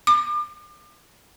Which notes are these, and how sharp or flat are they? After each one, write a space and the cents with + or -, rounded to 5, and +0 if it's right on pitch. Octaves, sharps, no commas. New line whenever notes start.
D6 +35